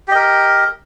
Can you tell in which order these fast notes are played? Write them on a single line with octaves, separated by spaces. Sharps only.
G4 D#5 A#4